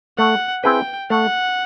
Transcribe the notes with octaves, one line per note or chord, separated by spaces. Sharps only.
A3 F#5
C4 E4 G#4 B4 G5
A3 F#5